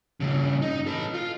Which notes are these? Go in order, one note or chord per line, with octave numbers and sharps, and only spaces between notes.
G2 C#3
D#4
A4 B4
F4